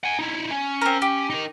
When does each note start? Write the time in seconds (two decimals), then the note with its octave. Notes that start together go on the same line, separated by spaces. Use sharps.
0.03 F#5 G#5
0.19 D#4 E4
0.51 C#4
0.81 C4 A#4
1.02 G4
1.30 D#4 A#4